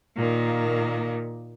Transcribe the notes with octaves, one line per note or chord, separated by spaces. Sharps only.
A#2 D#3 A#3